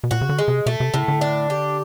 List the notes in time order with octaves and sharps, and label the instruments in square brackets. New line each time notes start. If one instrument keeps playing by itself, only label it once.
[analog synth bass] B2
[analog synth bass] A#2 [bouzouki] F#4
[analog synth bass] C#3
D3
[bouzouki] G#3
[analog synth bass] C3
[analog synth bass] B2 [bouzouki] A3
[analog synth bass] C3
[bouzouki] A2 [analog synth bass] C#3
[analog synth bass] D3
[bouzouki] D4
G4